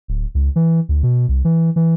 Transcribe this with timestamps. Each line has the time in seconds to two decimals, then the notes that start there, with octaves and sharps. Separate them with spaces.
0.08 D1
0.35 C#2
0.56 E3
0.89 D2
1.03 B2
1.29 C2
1.45 E3
1.76 E3